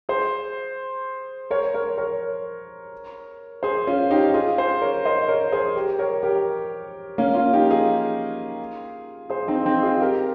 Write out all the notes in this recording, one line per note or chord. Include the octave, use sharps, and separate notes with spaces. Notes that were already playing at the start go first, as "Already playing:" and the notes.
G#4 C5
A#4 C#5
A#4 C#5
A#4 C#5
G#4 C5
C#4 F4
D#4 G4
F4 G#4
G#4 C5
A#4 C#5
C5 D#5
A#4 C#5
G#4 C5
G4 A#4
A#4 C#5
G4 A#4
A#3 C#4
C#4 F4
D#4 G4
F4 G#4
G#4 C5
C4 D#4
C4 D#4
F4 G#4
G4 A#4